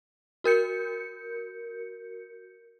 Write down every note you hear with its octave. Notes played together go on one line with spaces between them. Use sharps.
F#4 A#4 G6 C#7